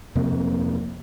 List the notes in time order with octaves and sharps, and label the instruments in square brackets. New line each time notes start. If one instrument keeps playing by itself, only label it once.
[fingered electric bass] F2 C3 A#3